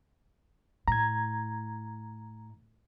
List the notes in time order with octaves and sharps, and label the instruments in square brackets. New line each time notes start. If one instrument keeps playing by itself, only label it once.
[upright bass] A2 [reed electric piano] A#5 G#6